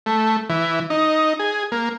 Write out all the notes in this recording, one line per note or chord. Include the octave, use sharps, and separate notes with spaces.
A3
E3
D#4
G#4
A#3